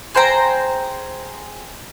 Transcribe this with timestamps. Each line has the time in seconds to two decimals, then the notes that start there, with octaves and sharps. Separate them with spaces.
0.15 G#4 C5 G5 A#5